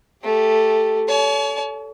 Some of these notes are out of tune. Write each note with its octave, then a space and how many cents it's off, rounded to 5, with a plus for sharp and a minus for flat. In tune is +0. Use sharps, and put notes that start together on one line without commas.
A3 +0 G4 +0
C#5 +30 A5 -45